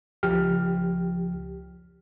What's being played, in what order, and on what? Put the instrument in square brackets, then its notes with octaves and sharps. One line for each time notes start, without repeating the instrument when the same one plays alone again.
[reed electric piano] C#2 F3 G4 F6